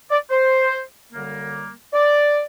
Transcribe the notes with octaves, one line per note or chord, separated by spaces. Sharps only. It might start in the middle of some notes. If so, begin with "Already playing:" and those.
D5
C5
F#2 D3 G3 A#3
D5